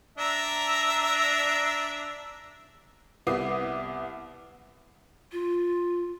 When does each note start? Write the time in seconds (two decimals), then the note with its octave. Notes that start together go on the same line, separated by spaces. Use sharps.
0.18 D4 E5 A#5
3.27 C2 B3 E4 D6 D#6 C7
5.32 F4